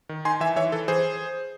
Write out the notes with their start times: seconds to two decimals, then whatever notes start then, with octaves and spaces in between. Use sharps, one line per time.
0.09 D#3
0.25 D#4 G#5 C6
0.40 E3 E5 G#5
0.56 E3 C#5 E5
0.72 E3 A4
0.88 E3 G#4 C5